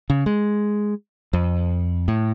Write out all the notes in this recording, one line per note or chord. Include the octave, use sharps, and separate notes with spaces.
C#3
G#3
F2
A2